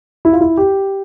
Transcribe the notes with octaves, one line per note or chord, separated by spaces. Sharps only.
E4
F4
E4
G4